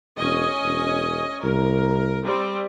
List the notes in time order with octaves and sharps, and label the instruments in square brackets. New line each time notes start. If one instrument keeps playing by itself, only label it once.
[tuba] E1 [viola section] C#4 D#5 G#5
[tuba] E1
[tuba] C2 [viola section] A#4
[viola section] G3 C4